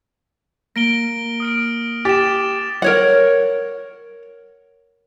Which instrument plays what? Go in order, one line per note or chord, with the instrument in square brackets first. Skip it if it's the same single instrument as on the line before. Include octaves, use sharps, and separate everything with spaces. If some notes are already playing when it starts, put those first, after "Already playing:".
[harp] A#3 [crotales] A#6 D7 G7
[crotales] D#6 F6 D7
[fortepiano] G4 [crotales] A6 E7
[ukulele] A#4 C#5 F#5